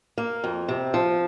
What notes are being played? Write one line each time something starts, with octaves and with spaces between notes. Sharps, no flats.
A#3
F2
C3
F3